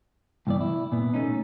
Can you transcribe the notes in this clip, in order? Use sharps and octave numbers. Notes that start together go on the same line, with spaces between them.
C2 G2 E3 B3 D5
E4
A#2 B3
A3 A#3 C#4 D#4